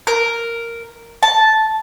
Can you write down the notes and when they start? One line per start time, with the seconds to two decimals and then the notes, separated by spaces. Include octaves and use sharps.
0.07 A#4
1.23 A5